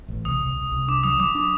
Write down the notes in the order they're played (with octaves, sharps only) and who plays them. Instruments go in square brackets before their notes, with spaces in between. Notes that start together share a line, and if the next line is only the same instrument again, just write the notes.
[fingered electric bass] A1
[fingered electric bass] C2 [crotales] D#6
[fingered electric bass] C2
C2
C2
[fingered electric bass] D4 [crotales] D6
[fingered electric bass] F#3 [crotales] D#6
[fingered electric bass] F#3 [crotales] D6
[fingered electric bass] D4 [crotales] D6